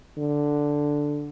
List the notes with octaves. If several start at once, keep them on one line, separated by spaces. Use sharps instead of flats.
D3